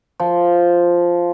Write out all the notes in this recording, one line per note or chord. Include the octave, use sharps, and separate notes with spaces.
F3